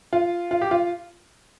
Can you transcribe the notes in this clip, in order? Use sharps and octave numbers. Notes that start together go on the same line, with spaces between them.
F4
F4
G4
F4